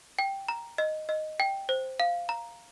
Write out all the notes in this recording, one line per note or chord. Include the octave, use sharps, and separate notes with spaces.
G5
A#5
D#5
D#5
G5
C5
F5
A#5